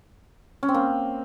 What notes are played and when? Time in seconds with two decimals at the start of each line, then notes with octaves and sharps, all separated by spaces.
0.63 C#4
0.69 C4
0.74 A#3